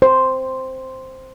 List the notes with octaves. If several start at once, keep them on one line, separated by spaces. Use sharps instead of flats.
C5